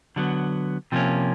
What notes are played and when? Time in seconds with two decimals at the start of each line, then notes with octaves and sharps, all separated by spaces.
0.16 D3 F#3 B3
0.92 C3 F3 A#3 C#4